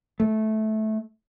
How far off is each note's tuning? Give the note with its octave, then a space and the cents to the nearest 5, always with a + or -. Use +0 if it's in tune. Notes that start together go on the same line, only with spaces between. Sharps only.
A3 -15